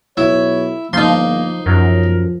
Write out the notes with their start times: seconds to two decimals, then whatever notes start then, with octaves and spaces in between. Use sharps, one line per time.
0.17 B1 E4 C#5
0.93 G1 F3 A#3 D#4 C6
1.66 F#2 F3 A#4